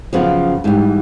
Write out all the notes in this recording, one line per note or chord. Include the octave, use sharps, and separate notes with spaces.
F#2 C#3 F3 B3
G#2 E3 G3